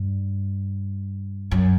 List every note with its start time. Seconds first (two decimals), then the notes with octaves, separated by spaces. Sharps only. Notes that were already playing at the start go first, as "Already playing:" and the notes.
Already playing: G2
1.51 F#2